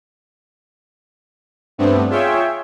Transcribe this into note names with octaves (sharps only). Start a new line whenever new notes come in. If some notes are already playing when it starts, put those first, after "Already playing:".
G2 A3 B3 C4 D4
F4 G#4 C#5 E5 G5